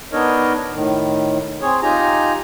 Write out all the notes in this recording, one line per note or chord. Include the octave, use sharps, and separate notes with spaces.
B3 D4 D#4 A#4 C#5 D#5
A2 D#3
C4 G#4 C#5
D#4 F4 G4 G#5 A#5